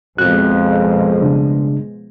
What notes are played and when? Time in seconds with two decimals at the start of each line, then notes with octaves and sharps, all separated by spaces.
0.18 F2 B2 F3 G#3 F#4 F#6
1.21 C#3 G3 D4